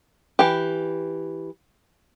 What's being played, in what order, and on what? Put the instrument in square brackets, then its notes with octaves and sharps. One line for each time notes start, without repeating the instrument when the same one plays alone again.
[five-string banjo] E3 G4